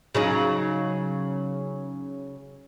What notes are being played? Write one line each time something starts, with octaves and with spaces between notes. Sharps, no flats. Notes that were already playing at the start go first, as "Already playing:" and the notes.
C#3 F#3 D#4